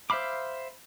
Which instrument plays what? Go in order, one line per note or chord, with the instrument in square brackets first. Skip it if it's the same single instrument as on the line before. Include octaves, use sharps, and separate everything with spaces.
[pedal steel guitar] C5 E5 F5 B5 D6